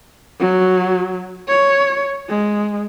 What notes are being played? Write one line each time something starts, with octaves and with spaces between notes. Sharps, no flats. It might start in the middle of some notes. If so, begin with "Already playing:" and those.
F#3
C#5
G#3